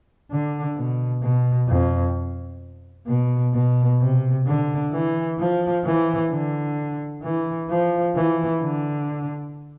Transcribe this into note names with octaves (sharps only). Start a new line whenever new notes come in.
D3
B2
B2
F2
B2
B2
C3
D3
E3
F3
E3
D3
E3
F3
E3
D3